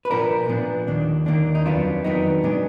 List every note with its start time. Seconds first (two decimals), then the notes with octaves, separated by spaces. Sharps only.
0.05 B4
0.10 A#2 F3 B3 D4 A#4
0.48 A#2 F3 B3 D4
0.87 D#2 D#3 A#3 D4
1.26 D#2 D#3 A#3 D4
1.55 D#4
1.66 F2 D#3 F#3 B3 D4 F4
2.04 F2 D#3 F#3 B3 D4 D#4
2.43 A#2 G#3 B3 D4